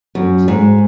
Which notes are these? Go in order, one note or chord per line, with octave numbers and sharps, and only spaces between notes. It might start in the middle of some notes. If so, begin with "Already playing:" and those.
F#2
G#2